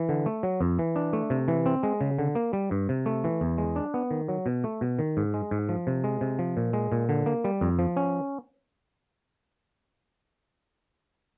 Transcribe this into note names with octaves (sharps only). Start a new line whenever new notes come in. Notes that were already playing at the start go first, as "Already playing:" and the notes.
Already playing: E3
D3
A3
F#3
F2
E3
D4
A3
C3
E3
C4
G#3
C#3
D3
A#3
G3
G2
C3
A3
E3
E2
G#3
D4
B3
D#3
F#3
B2
A3
B2
D#3
G#2
G#3
G#2
F3
C3
G#3
C3
F3
A#2
G#3
A#2
D3
A#3
G3
F2
F3
C#4